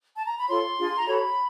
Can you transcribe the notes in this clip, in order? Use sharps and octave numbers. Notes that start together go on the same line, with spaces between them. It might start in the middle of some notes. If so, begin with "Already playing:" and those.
A5
A#5
B5
F4 A4 C#5 C6
D4 F4 G#4
A#5
F#4 A4 C#5 B5